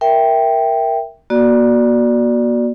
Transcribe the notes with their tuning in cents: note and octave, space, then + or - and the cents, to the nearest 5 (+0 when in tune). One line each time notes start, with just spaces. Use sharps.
A#4 +0 E5 +0 G5 +0
A#3 +40 F#4 +0 D5 +0